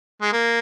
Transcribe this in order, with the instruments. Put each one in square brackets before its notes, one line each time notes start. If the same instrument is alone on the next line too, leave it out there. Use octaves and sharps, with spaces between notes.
[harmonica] G#3
A#3